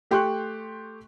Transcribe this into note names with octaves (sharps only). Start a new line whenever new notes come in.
A3 G4 G5 C6 C#6 F#6